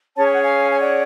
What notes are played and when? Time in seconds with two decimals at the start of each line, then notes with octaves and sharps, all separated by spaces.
0.16 C#4 G#4 C#5 A5
0.24 G#5
0.32 F#5
0.41 F5 G#5
0.71 G#5
0.78 D5 F#5